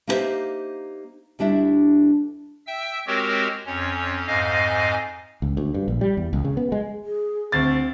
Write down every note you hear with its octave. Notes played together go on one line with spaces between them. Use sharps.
A#3 D#4 E4 G4 C5 E5
D2 G3 D4 E4 E5
E5 G5 E6
G#3 C4 F#4 G4 A#4 C#5
F2 C#4 C#5
F2 G#2 D#5 F5 G#5
C#2
D2
G2
A#1
G3
E2
C#2
C#3
B3
G#3
G#4
D2 C4 A6